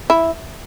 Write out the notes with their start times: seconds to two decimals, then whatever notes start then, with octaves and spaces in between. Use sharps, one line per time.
0.10 E4